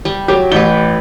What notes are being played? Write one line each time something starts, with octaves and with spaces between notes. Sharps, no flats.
G3
F#3 G4
A1 G4 B4 G7